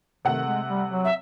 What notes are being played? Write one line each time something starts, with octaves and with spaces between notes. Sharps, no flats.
C3 D#3 A3 F#5
G#3
G3
F#3
E5